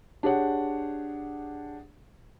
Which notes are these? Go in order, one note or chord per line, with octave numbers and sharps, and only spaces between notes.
D4 G4 G#4 C#5 F#5